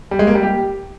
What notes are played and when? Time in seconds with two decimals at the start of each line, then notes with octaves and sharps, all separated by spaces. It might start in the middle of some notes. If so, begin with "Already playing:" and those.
0.11 G3
0.19 G#3
0.27 A#3
0.35 G3
0.43 G4